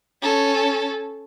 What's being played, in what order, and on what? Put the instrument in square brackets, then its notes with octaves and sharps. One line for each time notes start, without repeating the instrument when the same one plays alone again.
[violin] C#4 A4